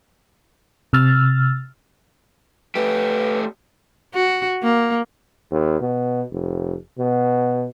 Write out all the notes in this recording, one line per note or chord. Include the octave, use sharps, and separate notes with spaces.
C3 E6 F6 A6
A3 G4 B4
F#4
A#3
D#2
B2
F1
B2